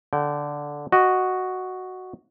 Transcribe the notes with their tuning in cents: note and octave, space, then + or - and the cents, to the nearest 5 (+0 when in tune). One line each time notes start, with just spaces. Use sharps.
D3 -5 G5 -30
F#4 +0 D#5 -10